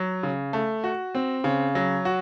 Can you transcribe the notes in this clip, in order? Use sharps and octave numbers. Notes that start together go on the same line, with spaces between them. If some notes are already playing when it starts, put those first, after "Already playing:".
Already playing: F#3
C#3
A3
F#4
C4
C#3
F#3
F#4